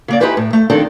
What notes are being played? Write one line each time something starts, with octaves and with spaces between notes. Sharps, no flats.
C#3 A#3 D5
D#4 E4 G4 G#4 B4 C5
A2
A3
F2 D#3 C4 D4 A4